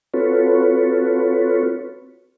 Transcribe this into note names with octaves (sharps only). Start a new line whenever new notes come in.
C4 F4 F#4 A4 B4 C#5